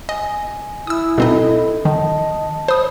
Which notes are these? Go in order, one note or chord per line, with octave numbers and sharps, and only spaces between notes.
D#5 G#5
E4 D#6 E6
B2 C4 D#4 A4 D#5
D#3 D#5 A5
C5 B5 D#6